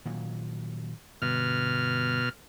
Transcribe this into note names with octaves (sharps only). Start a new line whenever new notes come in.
A#2 D#3 F#3
G1 B2 F6